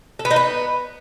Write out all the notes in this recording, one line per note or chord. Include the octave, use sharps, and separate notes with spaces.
A4
B3
D#4
B3